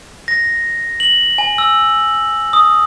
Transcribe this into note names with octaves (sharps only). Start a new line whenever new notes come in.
A#6
F#7
G#5
E6
D#6